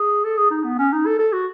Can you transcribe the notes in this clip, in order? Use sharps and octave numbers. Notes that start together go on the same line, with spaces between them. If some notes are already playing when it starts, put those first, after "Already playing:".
Already playing: G#4
A4
G#4
D#4
B3
C#4
D#4
A4
A4
F#4